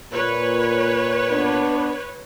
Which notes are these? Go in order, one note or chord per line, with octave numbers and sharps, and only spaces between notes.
A#2 B4 C#5
B3 D4